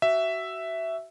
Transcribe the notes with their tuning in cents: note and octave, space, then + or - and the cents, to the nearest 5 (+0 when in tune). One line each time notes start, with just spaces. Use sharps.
F#4 +25 E5 +0